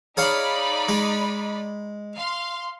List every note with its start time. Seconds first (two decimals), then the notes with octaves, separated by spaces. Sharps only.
0.17 D#4 G#4 C#5 D5 F5 B5
0.89 G#3
2.16 F5 C6